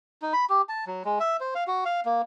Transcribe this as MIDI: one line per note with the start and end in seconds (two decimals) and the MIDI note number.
0.22 0.33 63
0.33 0.45 83
0.50 0.62 67
0.69 0.85 81
0.87 1.03 54
1.05 1.19 56
1.20 1.37 76
1.41 1.54 72
1.55 1.64 77
1.68 1.84 66
1.85 2.01 77
2.05 2.22 58